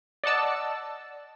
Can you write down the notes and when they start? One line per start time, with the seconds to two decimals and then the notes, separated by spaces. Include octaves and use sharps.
0.24 D5 D#5 F#5 A5 E6